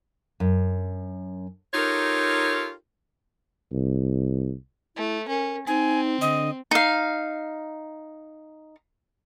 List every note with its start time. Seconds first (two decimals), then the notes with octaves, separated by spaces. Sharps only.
0.40 F#2
1.73 D#4 F4 G4 A4 A#4 C#5
3.73 C2
4.96 A3 E4
5.28 C#4 A#4
5.67 C4 D#4 G#5
6.21 D3 D#5
6.71 D#4 F5